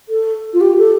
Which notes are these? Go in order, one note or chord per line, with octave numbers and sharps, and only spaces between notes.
A4
F4
G4
A4